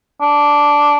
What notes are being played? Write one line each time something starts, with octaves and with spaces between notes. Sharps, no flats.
D4